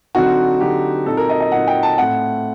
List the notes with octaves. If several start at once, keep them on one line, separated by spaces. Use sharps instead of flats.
D3 F#3 C4 D#4 F#4
D3 F#3 C4 D#4 G4
A#2 F#3 C4 D#4 A4
A#4
D#5
D#5
A#2 F#3 C4 D#4 F#5
G5
A5
A2 A3 C4 F#5